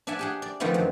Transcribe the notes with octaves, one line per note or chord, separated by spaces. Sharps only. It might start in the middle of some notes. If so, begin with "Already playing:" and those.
D4 D5 E5 F#5 G#5
G4 G#4 F#5
D5
D3 D#3 F3 A3 B3 C4
F#2